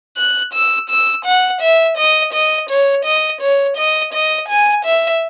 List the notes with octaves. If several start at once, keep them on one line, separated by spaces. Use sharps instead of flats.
F#6
E6
E6
F#5
E5
D#5
D#5
C#5
D#5
C#5
D#5
D#5
G#5
E5